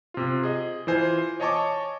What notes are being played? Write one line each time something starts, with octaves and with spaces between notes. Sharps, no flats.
C3 F4
G#4 D#5
E3 F4 C5 G#5
C#5 D#5 G#5 A5 C#6 D6